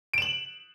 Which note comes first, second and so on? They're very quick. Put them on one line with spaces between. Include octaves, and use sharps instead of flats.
D7 E7 F#7